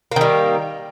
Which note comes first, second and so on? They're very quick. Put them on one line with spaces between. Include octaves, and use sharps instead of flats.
A#3 D#3 G3